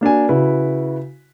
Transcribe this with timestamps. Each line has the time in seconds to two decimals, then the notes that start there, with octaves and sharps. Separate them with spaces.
0.01 A#3 D4 F#4 G#5
0.29 C#3 E4 F#4 B4